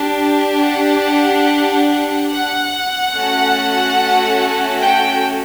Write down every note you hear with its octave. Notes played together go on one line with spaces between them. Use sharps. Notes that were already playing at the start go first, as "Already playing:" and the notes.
Already playing: D4 G4
F#5
F#5
A3 C#4 F#4 A4
G5